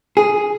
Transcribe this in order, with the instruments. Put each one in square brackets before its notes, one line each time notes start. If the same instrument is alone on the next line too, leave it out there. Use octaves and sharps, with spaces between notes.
[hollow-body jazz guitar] G#4